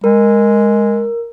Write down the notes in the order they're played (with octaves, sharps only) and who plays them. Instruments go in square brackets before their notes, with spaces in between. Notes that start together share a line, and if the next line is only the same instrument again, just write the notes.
[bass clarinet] G#3 [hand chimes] A#4